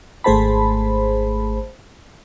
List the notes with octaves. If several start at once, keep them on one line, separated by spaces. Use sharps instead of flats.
G#1 A3 G#4 C5 A5 B5